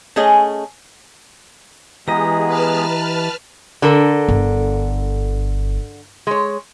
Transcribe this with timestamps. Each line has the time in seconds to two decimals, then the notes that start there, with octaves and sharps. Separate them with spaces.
0.16 A3 C#4 G#4 D#5
2.08 E3 G#3 B3 G4 G#4 D#5 A#5
2.46 B4 A5 F6
3.82 D3 A4 A#4
4.29 G1
6.27 G#3 C#5